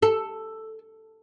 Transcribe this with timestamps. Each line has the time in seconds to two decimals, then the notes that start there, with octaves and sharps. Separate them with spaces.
0.02 A4